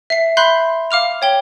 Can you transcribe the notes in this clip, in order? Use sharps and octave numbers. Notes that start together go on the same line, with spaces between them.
E5 C7
E5 B5 C6 F#6 G6 C7
F5 D6 F6 F7
C#5 G5 G7